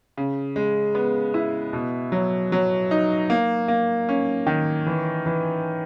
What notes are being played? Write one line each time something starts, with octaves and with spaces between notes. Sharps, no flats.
C#3
G#3
B3
E4
B2
F#3
F#3
D#4
A#3
A#3
C#4
D#3
E3
E3